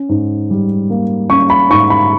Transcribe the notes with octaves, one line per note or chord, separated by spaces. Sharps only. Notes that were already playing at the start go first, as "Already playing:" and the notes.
Already playing: C#4
G#2
G3
A#3
C#4 C#6
B5
G#2 C#6
B5